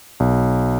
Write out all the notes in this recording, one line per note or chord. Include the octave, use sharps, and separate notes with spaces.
B1